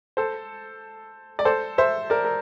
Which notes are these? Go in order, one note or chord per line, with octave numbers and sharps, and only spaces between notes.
A4 C5
D5
A4 C5
C5 E5
A#4 D5
A#4